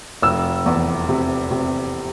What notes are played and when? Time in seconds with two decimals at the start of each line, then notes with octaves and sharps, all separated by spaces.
0.22 F1 E6
0.66 E2
1.09 C3
1.51 C3